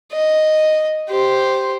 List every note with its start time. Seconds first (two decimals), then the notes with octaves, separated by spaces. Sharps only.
0.12 D#5
1.10 G4 C5